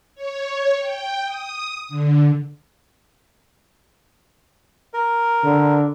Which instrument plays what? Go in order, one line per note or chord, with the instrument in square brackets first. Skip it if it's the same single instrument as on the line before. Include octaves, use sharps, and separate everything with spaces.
[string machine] C#5
G5
D#6
D3
[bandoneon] A#4
[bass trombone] D3